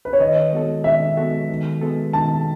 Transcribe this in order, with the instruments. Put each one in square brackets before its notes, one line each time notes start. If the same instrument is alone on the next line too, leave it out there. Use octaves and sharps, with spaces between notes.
[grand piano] B4
C#5
[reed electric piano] D#3 [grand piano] D#5
[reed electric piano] G#3 B3 F#4 A4
[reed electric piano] D#3 [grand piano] E5
[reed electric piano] G#3 B3 F#4 A4
D#3
G#3 B3 F#4 A4
[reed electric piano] D#3 [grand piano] A5